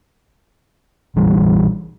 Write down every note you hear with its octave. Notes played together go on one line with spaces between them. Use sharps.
A#1 E3 G3